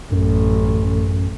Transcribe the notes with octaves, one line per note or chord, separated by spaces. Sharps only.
A1 F#2